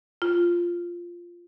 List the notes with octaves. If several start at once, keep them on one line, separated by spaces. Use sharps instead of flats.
F4